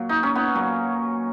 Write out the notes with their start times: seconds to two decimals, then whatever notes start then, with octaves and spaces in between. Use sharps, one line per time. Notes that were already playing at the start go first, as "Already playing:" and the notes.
Already playing: A#2 F#3
0.09 D#4
0.23 C#4
0.35 B3 D#4
0.55 A#2 F#3